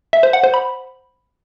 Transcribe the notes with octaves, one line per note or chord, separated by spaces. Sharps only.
E5
C5
F#5
C5
B5